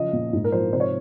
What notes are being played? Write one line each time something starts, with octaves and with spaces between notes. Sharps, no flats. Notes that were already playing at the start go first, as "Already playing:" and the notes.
Already playing: C#3 F3 D#5
A#2
G#2
A#4
F3 C5
C3 C5
C#5